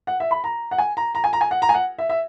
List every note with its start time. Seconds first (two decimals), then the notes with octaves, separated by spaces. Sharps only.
0.07 F#5
0.20 E5
0.31 B5
0.44 A#5
0.71 F#5
0.78 G#5
0.97 A#5
1.15 A#5
1.24 G#5
1.33 A#5
1.41 G#5
1.51 F#5
1.62 A#5
1.69 G#5
1.74 F#5
1.99 E5
2.09 E5